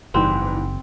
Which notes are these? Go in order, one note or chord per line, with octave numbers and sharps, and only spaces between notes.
F#1 G#2 E3 G3 C4